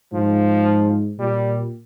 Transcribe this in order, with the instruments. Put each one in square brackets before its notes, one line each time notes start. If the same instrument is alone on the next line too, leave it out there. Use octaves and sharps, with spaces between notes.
[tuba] G#2 [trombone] F3
[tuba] A#2 [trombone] G3